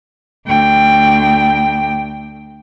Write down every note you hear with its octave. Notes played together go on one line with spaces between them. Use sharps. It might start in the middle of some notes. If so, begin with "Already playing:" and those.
D2 G5